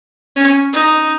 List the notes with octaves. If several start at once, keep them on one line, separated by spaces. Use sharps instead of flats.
C#4
D#4